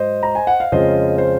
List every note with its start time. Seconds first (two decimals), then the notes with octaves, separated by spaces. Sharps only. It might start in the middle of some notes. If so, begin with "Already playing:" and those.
Already playing: G#2 F#3 C5 D#5
0.23 A#5
0.35 G#5
0.47 F#5
0.60 F5
0.72 F2 C#3 G#3 C#4 F4 C5 D#5
1.18 C5